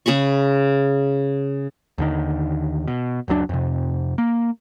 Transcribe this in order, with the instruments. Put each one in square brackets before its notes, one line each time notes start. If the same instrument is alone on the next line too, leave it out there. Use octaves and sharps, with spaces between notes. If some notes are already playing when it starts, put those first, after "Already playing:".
[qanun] C#3 G#4 B5 C#6
[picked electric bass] D#2 D3 D#3
B2
F#1 C#2 F#3 D4
F2 C3
A#3